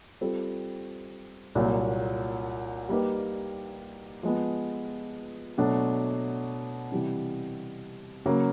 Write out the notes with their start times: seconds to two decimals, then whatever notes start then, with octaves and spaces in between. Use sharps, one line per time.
0.21 G3 C4 F4 A4
1.55 C2 A#2 F#3
2.89 G3 A#3 D#4 G4 B4
4.23 F3 G#3 B3
5.58 B2 F#3 A3 D4
6.92 C3 E3 G3
8.26 C#3 F#3 A#3